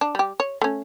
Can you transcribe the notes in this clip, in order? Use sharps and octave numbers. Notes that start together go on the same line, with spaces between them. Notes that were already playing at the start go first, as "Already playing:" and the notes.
D4
G3 G4
C#5
A3 C#4